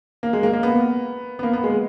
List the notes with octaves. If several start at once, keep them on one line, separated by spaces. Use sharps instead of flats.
A#3
G#3
A#3
A#3
B3
B3
A#3
B3
G#3